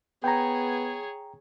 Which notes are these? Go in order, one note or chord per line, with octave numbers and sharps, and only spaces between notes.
B3 G#4 C#5 G5 A#5